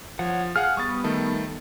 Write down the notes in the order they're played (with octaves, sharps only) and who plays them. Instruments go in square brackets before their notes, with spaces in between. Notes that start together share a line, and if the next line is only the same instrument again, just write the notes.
[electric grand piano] F3 [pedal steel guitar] C#5 F#5
[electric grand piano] G#4 F5 F#5 [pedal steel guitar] F6
[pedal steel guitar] G3 B3 [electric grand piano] C#6 D#6 A6
[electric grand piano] D#3 A3 A4